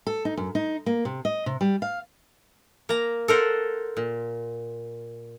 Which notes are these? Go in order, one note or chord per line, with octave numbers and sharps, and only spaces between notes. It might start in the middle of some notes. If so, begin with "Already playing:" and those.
A4
D#4
F#2
D#4
A#3
C3
D#5
C3
G3
F5
A#3 A#5
A4 A#4 C5 F#5
A#2